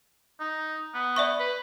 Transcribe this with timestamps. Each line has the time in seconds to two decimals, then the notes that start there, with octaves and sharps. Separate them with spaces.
0.40 D#4
0.94 B3
1.16 D5 E5 C#6
1.40 B4